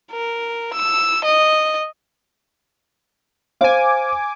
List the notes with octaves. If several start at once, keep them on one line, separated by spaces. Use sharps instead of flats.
A#4
E6
D#5
C5 F5 G#5 D6